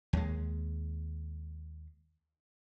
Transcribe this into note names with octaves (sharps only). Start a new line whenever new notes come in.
D#2 G#3